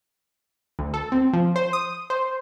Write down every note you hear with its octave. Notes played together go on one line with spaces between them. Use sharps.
D2
A4
C4
F3
C5
D#6
C5